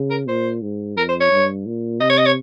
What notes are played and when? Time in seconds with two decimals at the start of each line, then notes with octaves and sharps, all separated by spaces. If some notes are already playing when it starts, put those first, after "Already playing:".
Already playing: C#3
0.10 A#4
0.28 A#2 C5
0.62 G#2
0.97 F2 A#4
1.09 C5
1.20 C#5
1.32 G2
1.66 A#2
2.00 C3 D#5
2.10 C#5
2.17 D#5
2.26 C#5